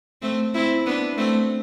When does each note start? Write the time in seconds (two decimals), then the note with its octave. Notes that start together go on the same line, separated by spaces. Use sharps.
0.22 A3 C4
0.54 C4 E4
0.86 B3 D4
1.18 A3 C4